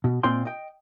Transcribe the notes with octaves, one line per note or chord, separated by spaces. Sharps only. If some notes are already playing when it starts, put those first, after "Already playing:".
B2
A#2 C4 F4 D#5 G5 C6
D#5 G5